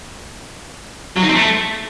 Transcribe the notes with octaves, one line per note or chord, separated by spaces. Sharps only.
F#3
D#4
C4
A3